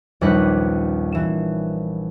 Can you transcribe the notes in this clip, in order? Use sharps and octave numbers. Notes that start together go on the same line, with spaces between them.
A#1 D#2 G3 C#4 B4 F#6
E3 E7